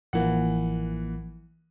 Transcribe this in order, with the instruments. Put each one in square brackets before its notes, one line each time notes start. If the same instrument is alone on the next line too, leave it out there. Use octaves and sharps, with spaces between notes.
[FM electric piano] A1 F3 A#3 [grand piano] E3 F#5